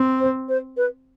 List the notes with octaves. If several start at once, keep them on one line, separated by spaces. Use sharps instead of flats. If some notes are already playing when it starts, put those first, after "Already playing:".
Already playing: C4
C5
C5
B4